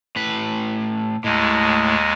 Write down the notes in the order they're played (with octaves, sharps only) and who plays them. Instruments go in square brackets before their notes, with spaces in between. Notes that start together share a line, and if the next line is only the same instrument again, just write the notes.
[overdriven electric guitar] A2 B4
[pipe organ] D#2 G#3 [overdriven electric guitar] A2